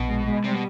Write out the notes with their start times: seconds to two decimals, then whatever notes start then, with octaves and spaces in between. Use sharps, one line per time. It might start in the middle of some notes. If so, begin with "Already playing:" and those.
Already playing: A#1 B2
0.08 G#3
0.26 G#3
0.44 C3 G3
0.54 B2